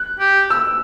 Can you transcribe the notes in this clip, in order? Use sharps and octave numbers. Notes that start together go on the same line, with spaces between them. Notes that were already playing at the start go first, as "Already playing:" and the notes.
Already playing: F#6
G4
E6